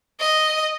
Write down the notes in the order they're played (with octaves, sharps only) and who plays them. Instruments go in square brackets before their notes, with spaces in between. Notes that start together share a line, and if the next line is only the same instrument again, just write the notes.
[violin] D#5